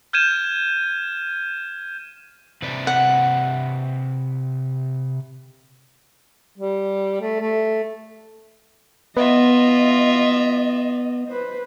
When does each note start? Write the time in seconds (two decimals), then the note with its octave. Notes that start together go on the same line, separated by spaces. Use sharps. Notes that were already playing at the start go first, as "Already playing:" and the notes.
0.13 F6 G6 G#6 D#7 E7
2.62 C3 B4 D5
2.87 F#5
6.58 G3
7.21 A3
7.40 A3
9.17 B3 F4 D#5 E5
11.28 B4 C5